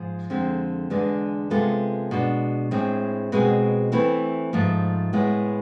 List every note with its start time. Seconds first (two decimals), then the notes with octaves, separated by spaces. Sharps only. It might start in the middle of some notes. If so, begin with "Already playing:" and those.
Already playing: G#2 F3 G#3
0.30 F2 D3 G#3 C4
0.90 E2 D3 G#3 D4
1.50 C3 G#3 B3 F4 A4
2.11 B2 G#3 D4
2.71 A2 G#3 C4 G#4
3.32 B2 G#3 C4 G#4
3.92 E3 A3 C4 E4
4.53 G#2 F3 A3
5.13 A2 G#3 B3 E4